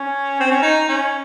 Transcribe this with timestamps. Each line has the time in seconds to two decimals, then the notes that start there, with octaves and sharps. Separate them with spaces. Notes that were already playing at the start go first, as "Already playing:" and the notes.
Already playing: C#4
0.40 C4
0.51 C#4
0.62 D#4
0.89 C#4